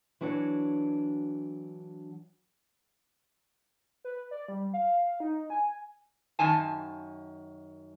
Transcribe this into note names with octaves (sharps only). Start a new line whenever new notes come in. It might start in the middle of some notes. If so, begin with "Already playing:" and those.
E3 F#3 D4 F#4 C#5
B4
D5
G3
F5
D#4
G#5
F#2 D#3 G#5 A5